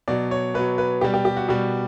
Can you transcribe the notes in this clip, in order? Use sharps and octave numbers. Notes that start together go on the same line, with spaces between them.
B2 F#3 D5
C#5
B2 F#3 B4
B4
B2 G3 G4
G4
G4
F#4
B2 G3 G4